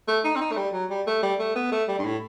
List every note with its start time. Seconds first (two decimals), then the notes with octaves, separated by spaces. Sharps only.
0.08 A3
0.25 D#4
0.36 C4
0.41 D#4
0.52 A3
0.57 G3
0.73 F#3
0.90 G3
1.07 A3
1.23 G3
1.39 A3
1.56 B3
1.72 A3
1.88 G3
1.99 G2
2.05 A2